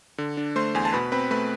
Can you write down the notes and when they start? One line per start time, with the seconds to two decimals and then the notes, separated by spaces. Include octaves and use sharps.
0.18 D3
0.37 D4
0.56 A3 C5 C6
0.75 E2 G#5
0.85 A5
0.93 B2 B4 B5
1.12 C4 B4 B5
1.31 A3 B4 B5